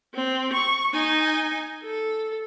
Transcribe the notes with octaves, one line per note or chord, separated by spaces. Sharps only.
C4
C#6
D#4 G#5
A4